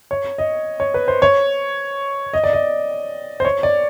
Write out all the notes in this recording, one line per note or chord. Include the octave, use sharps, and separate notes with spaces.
C#5
D#5
C#5
B4
C5
C#5
D#5
D5
D#5
C5
C#5
D5